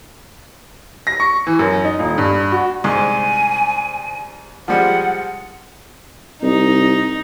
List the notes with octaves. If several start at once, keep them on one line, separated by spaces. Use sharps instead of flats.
A#6
C#6
E3
F#2
D#4
D#1
G2
F#4
C2 G#2 G#5
F3 G3 G#3 F#5
C2 D#4